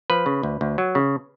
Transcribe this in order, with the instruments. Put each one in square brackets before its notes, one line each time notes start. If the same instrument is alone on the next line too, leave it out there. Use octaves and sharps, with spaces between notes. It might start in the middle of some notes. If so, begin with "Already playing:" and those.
[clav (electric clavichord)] F3 B4
C#3
D2
D2
F#3
C#3